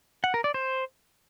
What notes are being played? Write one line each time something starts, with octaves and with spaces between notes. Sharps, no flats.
F#5
A#4
D5
C5